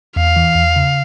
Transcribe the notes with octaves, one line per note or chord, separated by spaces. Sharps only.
E2 F5
E3
E2
C#3